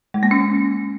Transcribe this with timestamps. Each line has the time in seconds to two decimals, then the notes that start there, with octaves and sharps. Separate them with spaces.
0.14 G#3
0.23 A#3
0.31 C#4